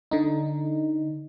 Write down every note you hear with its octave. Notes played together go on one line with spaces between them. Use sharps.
D3 D#4